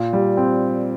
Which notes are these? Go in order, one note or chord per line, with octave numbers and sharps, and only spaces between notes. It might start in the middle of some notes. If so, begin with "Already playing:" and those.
Already playing: A#2
G3
C4